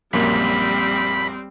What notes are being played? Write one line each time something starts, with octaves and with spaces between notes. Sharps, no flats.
A#1 F#2 G3 A#3 C4 B5